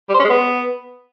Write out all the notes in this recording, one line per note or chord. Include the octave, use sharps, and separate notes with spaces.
G3
C5
C#4
G#3
B3